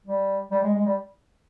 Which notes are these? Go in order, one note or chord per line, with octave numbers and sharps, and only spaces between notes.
G3
G3
G#3
G#3
G3